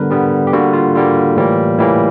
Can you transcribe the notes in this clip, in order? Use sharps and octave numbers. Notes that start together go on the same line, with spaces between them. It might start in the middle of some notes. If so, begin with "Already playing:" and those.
Already playing: D3 G3 B3 A#4 B4
D3 G3 B3
G4
D3 G3 A#3 F#4
F4
D3 G3 A#3
A2 E3 G3 A#3
A2 E3 G3 A#3 E4